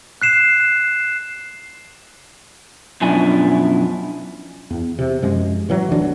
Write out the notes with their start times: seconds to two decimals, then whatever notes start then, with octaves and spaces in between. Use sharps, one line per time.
0.22 F#6 C7 E7
3.01 F#2 B2 F3 D4 E4 G#5
4.70 E2
4.99 C3
5.22 F#2 F3 G#3
5.69 A1 E3 F#3
5.92 E1 D2 E3 D4